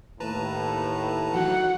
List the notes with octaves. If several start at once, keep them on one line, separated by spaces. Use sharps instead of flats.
D#2 A2 B4 A5 A#5
E3 F#3 D#4 F#4 F#5